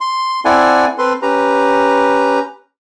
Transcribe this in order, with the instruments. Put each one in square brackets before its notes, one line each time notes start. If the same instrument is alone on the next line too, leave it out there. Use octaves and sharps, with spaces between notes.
[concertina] C6
C4 E4 A4 D5 F#5 G#5
C4 A4 B4 C6
C#4 G4 B4 A#5